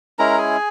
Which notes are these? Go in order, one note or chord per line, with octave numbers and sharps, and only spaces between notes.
G#3 C#4 E4 A#4 A#5
G#4 G#5